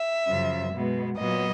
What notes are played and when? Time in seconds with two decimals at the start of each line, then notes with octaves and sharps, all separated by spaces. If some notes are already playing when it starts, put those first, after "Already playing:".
Already playing: E5
0.26 F#2 C#3 F3
0.72 B2 G#3 B3
1.17 A#2 F#3 B3 D#5